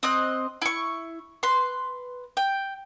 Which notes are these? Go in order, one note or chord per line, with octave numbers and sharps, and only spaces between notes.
C4 D#5 F#6
E4 C#6
B4 C6
G5